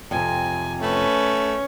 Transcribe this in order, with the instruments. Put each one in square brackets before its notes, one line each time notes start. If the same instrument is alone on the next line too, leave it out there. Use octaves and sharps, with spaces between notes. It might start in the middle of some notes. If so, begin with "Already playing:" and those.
[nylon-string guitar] F2 C3 [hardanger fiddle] G#5
[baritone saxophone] A3 [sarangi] C#4 [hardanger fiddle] B4